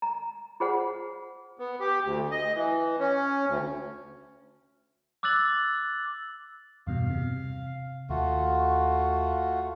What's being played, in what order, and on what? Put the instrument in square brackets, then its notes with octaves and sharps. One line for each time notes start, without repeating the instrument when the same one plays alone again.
[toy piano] A#5
F4 G#4 C5 F#5
[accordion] B3
G4
D2
D#5
E3
C#4
D2
[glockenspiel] D6 E6 F#6 A6 F#7
[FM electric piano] E2 G2 B2 [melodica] F5
[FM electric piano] C3
[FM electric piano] D#2 [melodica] A3 F4 F#4